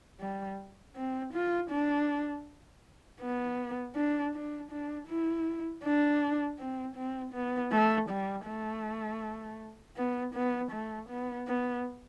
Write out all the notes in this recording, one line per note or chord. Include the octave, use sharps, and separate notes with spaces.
G3
C4
F4
D4
B3
D4
D4
D4
E4
D4
C4
C4
B3
A3
G3
A3
B3
B3
A3
B3
B3